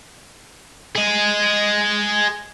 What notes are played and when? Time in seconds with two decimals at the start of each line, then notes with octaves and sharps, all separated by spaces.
0.96 G#4 D#5